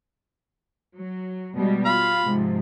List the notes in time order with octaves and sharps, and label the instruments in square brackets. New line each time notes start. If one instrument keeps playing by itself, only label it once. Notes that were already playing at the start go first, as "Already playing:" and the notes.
[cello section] F#3
B2 G3 G#3
[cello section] F4 [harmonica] F5 B5
[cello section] G#2 C3 F3